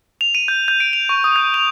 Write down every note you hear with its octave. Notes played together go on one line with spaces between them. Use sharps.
F7
D#7
G6
G6
D7
F7
C#6
D#6
G6
F7